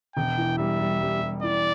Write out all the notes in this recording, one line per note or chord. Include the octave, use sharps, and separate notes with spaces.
E1 G5
E3
G3 E5
G3
G3
G3
E3 D5